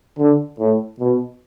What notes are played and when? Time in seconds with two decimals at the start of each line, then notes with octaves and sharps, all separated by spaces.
0.19 D3
0.59 A2
1.00 B2